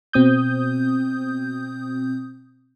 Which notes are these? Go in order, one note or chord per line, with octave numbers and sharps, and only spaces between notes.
B2 C4 D#6 G6